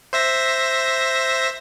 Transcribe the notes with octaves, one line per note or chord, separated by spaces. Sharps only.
C5 E5 A#6